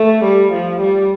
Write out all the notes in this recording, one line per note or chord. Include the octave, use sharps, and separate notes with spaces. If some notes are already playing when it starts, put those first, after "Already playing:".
Already playing: A3
G3
F3
G3